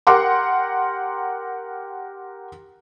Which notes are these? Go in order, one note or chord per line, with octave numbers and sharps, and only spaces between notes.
G4 A#4 F#5 C6 D6